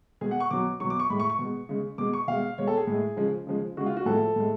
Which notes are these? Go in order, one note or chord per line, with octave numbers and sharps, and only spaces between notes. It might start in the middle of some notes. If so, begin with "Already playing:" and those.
B2 G#3 G#4
F#5
C#6
B2 F#3 D6
B2 F#3 C#6
D6
C#6
A2 G#3 B5
C#6
C#6
B2
G#3
C#3 G#3
B2 G#3 D6
C#6
B2 G#3 F5
B2 G#3 C#5
A4
G#4
A2
G#3
C#3 F3 G#3
C#3 F3 G#3
C#3 G#3 F#4
F4
F#4
A2 F3 G#3 A4
A2 G#3